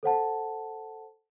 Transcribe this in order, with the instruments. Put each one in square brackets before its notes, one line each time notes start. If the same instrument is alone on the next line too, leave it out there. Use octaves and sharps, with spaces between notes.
[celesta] A4 C5 F#5 A5